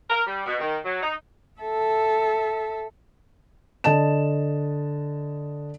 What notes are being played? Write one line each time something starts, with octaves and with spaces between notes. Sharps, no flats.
A#4
G3
B2
D#3
F#3
D#4
A4 E5
D3 D#5 A5 E7